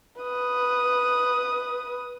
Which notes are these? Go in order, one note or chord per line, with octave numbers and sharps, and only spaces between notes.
B4 D#6